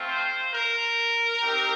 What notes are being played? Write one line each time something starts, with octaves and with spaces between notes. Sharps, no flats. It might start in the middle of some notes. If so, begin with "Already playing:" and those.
Already playing: A3 C4 F4
C5
A#4
C4 D#4 G4